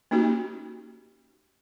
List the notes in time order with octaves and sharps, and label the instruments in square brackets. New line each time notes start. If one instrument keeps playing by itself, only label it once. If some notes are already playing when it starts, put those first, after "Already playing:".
[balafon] A#3 C#4 D#4 F#4 G4